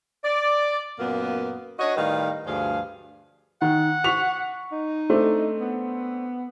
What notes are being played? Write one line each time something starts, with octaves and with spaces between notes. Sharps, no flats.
D5
F#2 A#2 A#3 B3
D4 F#4 C#5 D#5
A2 D#3 G3 B4 F5
D2 G2 F3 G#4 F5
D#3 F#5
C#6 B6 F7
D#4
A3 C4 D4
B3